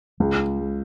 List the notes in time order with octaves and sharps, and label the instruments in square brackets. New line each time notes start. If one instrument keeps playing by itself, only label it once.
[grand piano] C#2 [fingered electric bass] G#3